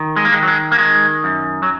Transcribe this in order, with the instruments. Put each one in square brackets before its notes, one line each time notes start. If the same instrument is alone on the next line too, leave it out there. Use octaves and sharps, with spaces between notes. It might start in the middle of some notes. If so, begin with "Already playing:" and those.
Already playing: [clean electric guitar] D#3
G#3
A#3
D#3 G#3
F#3
G#3
A#3
D#3 G#3
F#2
F#3